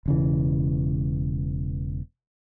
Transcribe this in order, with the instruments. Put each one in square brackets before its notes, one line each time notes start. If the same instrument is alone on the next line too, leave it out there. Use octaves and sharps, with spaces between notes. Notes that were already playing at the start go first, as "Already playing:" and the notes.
[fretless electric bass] E1 C#3 E3